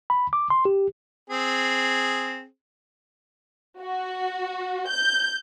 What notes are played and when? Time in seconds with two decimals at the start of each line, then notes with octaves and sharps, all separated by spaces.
0.10 B5
0.33 D6
0.50 C6
0.65 G4
1.30 C4 G#4
3.81 F#4
4.88 G6